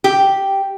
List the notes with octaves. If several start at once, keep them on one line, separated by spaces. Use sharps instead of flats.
G4